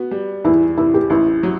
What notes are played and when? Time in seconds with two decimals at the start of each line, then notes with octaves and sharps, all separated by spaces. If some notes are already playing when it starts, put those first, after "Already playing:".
Already playing: B3 F#4
0.11 G3
0.44 E2 E4
0.77 C3 E4
0.94 G4
1.10 A1 E4
1.43 F#3